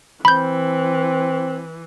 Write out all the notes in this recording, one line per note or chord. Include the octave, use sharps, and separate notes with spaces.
E3 C4 B5 G6